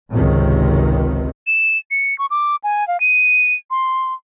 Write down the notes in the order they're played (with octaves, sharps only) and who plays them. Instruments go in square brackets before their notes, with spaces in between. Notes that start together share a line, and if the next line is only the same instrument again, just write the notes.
[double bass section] G#1 C#2 C3 D#3
[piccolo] E7
C#7
C#6
D6
G#5
F5
D#7
C6